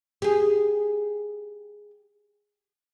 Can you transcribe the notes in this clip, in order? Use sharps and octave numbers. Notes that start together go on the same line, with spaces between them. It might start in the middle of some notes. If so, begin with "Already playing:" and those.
G4 G#4